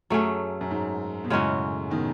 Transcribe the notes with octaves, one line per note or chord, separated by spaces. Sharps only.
F#2 F#3 A3 C#4 G#4
F#2
G#2
B2
F#2 A2 C#3 G#3 C#4 F#4
B2 D#3